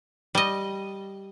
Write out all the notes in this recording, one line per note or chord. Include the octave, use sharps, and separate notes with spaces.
G3 D#5